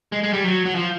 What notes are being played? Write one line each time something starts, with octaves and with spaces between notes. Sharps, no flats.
G#3
G#3
G3
F#3
F#3
F3